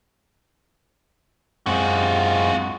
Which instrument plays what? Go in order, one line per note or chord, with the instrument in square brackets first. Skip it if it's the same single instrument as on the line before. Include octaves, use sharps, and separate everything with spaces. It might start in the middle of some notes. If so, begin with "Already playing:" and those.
[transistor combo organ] F#2 G#3 C4 [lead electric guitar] F4 F#4